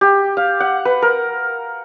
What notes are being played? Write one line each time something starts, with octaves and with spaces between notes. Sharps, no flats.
G4
F5
F#5
B4
A#4